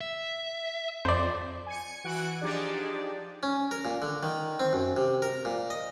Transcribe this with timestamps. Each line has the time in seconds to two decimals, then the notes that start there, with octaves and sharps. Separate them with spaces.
0.01 E5
1.05 F2 C5 D5
1.66 G#5 C#7
2.04 E3 F#4 F#5 G#5 F#6 D7
2.41 F3 D4 D#4 G4 G#4 D5
3.43 C#4
3.71 A#4
3.85 A#2
4.02 D3
4.23 D#3
4.60 C4
4.73 F#2
4.97 C3
5.22 A#4
5.45 A#2
5.70 D#5